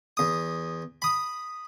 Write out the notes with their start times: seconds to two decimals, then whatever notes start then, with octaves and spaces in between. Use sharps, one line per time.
0.17 E2 D#6
1.02 B5 D#6